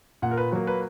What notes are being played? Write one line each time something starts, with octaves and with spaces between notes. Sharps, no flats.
A#2 F#5
A#4
B4
F#3 A#3
B4